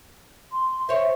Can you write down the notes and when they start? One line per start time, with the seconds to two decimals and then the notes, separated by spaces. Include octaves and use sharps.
0.52 C6
0.89 C5 C#5 E5